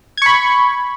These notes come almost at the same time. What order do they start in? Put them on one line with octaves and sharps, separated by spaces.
G#6 C#6 B5